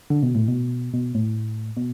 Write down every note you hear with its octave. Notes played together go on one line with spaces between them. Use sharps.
D3
B2
A2
B2
B2
A2
B2